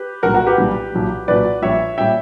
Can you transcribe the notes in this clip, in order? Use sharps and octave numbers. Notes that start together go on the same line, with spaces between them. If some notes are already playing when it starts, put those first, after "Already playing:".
Already playing: G4 B4
B1 A#2 G3 F#4 A#4
F#4 A#4
G4 B4
B1 A#2 G3
B1 A#2 F#3
B1 A#2 F#3 B4 D5
A#1 A#2 G3 C#5 E5
A#2 G3 E5 G5